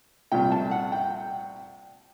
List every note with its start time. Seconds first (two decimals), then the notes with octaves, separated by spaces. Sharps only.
0.32 C2 A#2 G5
0.52 A5
0.71 F#5
0.92 G5